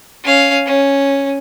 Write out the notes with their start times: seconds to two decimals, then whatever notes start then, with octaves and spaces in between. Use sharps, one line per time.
0.24 C#4 F5
0.66 C#4